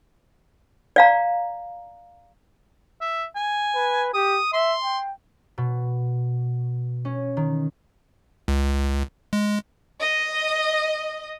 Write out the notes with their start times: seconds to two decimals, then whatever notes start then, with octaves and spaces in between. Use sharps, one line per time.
0.96 D5 F5 A#5
3.01 E5
3.36 G#5
3.75 B4
4.14 G4 D#6
4.53 E5 C6
4.83 G5
5.58 B2
7.05 C#4
7.37 D#3
8.48 C#2
9.33 G#3
10.00 D#5